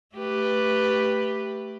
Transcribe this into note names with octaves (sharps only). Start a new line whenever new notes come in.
A3 G4 B4